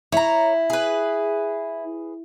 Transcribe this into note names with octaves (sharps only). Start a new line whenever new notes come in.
E4 C#5 A#5
G#4 B4